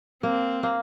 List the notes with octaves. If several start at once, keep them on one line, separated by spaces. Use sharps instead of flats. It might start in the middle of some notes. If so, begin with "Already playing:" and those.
A#3 C4
A#3